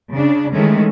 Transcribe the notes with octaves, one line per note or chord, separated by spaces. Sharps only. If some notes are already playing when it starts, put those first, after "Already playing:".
C#3 D4
D#3 E3 G#3 A3 C#4